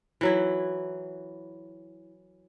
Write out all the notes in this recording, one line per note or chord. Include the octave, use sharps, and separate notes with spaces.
E3 F#3 E4